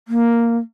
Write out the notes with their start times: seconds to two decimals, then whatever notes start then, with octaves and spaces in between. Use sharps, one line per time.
0.08 A#3